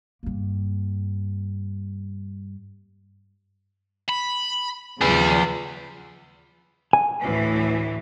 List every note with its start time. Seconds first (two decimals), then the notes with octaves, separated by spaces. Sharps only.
0.23 G2 A#3
4.09 B5
5.01 C#3 F3 G3 G#4 B4
6.93 G#5
7.22 D2 A2 E3